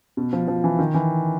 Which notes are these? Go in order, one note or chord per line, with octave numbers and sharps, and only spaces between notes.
B2
F3
F3
E3
D#3
E3